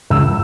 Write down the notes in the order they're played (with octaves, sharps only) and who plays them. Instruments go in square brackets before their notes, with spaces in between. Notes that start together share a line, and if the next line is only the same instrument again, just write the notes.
[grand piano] C#2 E6